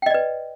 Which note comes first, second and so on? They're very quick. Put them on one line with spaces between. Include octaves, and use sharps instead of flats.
G5 D#5 D5 B4